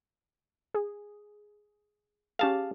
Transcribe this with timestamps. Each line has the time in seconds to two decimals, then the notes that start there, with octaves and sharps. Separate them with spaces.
0.74 G#4
2.39 C#4 G4 G#4 F5 A5